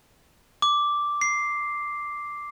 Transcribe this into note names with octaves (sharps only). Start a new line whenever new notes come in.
D6
C7